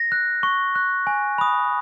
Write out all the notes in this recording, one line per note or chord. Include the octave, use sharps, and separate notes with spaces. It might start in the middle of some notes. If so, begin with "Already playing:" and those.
Already playing: A#6
F#6
C#6
F#6
G#5
B5 D#6